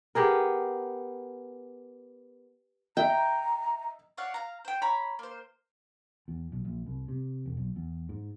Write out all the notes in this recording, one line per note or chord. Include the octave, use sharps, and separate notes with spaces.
B3 G4 G#4 A#4
D#5 E5 G5 A#5
C#5 D5 F5 F#5
F5 A#5
C5 G5
C#5 A#5 B5
A#3 C5
E2
B1
A#1
C2
C3
E1
B1
E2
G#2